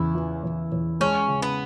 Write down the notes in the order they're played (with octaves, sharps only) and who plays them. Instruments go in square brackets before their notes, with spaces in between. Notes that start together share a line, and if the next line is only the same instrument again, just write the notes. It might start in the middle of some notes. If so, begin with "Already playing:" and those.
Already playing: [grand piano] E2 C#3 [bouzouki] E4
[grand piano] E3
E2
E2
[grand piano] G#3 [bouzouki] C#4
[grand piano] C#3
[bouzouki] B3